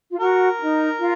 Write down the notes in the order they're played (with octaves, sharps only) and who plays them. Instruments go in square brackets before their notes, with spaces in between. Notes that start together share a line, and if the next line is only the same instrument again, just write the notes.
[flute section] F4
[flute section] F#4 [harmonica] A#4
[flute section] D#4
F4